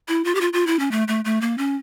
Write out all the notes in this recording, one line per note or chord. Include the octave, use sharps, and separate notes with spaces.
E4
F4
G4
F4
F4
E4
C#4
A3
A3
A3
A#3
C#4